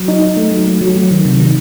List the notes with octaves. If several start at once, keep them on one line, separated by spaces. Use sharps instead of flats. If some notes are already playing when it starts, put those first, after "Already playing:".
Already playing: F#3
D#4
D#4
A3
F#3
A3
F#3
F#3
D#3
C3
D#3